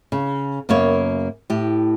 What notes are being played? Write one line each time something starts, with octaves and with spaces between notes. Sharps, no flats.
C#3
F#2 C#3 A#3 B3 C#5
A2 G4